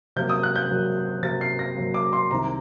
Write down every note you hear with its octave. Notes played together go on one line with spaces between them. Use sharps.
C3 F#3 A#3 G6
D#6
F#6
G6
C3 F#3 A#3
C3 F#3 A#3 A6
C7
A#6
C3 F#3 A#3
D6
C6
C2 C3 D#3 A#5